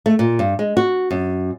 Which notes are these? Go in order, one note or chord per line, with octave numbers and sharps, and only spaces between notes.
A3
A#2
G2
G#3
F#4
F#2